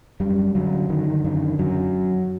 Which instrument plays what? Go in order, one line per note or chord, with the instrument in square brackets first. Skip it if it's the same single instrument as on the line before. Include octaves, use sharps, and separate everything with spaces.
[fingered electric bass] F#2 G3
D3 F#3
D3 D#3
F#2 D#3
F#2 F#3